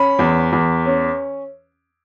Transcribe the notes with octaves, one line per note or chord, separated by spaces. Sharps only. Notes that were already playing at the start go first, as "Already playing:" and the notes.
Already playing: C#4 B5
E2
E2
C#4